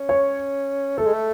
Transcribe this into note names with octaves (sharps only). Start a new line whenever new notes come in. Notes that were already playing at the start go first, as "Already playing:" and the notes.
Already playing: C#4
C#5
A3 A4
G#3
A3